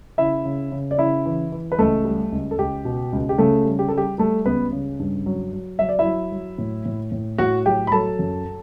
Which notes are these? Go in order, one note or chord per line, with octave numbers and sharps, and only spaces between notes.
C#3 E4 E5
C#3
C#3
D5
C#3 E4 E5
E3
E3
B4
C#2 A3 A4
G3
C#2
A4
C#2 G4
B2
C#2
G4
C#3 A3 A4
G3
G4
G3 A4
G4
G3 A3 A4
C#2 B3 B4
C#3
G2
F#3
F#3
F#3 E5
D5
E4 E5
F#3
F#3
A2
A2
A2
A2 F#4 F#5
F#3 G4 G5
B5
F#3 A4 A5
F#2